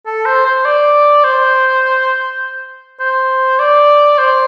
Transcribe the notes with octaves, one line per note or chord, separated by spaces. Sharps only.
A4
C5
C5
D5
C5
C5
D5
C5